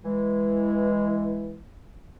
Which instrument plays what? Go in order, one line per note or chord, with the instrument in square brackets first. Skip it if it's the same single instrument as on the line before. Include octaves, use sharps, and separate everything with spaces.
[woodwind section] E3 G#3